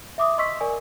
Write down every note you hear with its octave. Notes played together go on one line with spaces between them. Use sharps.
E5 D6 D#6
D#5 C6 C#6 E6 B6
A#4 D5 G#5